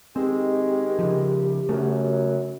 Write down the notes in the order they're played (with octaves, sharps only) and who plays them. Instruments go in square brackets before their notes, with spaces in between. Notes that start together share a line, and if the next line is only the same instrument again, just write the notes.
[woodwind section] D#3 G#3 [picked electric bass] C4 [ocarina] G4
[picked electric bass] C#3 F3
[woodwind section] F#2 [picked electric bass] C#3 A3